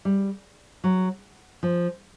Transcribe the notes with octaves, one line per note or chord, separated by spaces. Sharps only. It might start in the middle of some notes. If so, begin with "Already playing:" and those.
G3
F#3
F3